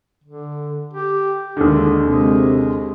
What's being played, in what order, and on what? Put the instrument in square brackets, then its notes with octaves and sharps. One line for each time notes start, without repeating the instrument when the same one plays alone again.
[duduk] D3
G4
[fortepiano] D#2 D3 [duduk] G#3
[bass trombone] C3 [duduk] G#3